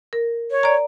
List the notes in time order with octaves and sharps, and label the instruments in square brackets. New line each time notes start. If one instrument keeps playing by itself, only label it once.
[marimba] A#4
[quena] C#5
[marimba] D5 A#5